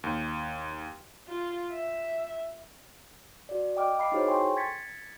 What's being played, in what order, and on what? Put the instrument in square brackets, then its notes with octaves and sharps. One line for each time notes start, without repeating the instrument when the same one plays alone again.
[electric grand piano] D#2
[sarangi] F4
E5
[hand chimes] F#4 D5
D#5 G5 D6 F6
D#5 F5 B5 D6 C7
D#4 E4 F#4 G#4 C5 C#5
A4 G5 G#5 C6 C#6
G#6 A6 B6 C#7